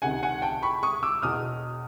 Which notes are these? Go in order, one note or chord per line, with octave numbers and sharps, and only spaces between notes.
C#2 C3 D#3 F#5 G#5
F#5 G#5
G5 A5
B5 C#6
C#6 D#6
D6 E6
E1 E2 B2 D#6 F6